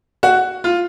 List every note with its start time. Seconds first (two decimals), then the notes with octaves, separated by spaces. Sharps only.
0.23 F#4
0.64 F4